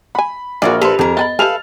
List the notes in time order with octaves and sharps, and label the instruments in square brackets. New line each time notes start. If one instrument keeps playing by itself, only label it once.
[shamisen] F#5 G#5 [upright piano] B5
[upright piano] A#1 A#4 [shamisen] F#4 G#4 [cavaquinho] D5 F5 C#6
[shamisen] A#3 C5 [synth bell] G4 [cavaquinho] A4 B4
[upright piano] F2 [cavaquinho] G#4 A#4
[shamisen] B3 G#5 B5 [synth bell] D#5 [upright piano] A6
[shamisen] G4 E5 G#5 [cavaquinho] A4 B4 F5 [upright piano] F6 F7